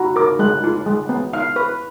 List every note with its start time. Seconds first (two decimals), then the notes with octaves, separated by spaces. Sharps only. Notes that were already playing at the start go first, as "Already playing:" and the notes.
Already playing: F#4 A#5 B5
0.16 A#4 D6
0.39 G#3 F#6
0.64 F4
0.86 G#3
1.09 B3
1.33 F5 F6
1.56 B4